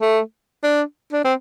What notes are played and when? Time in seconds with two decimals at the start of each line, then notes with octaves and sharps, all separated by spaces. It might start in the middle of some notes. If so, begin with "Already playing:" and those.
0.01 A3
0.63 D4
1.13 D4
1.25 C4